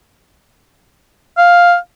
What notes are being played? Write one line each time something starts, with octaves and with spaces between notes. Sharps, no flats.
F5